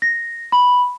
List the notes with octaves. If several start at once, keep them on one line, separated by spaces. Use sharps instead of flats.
A#6
B5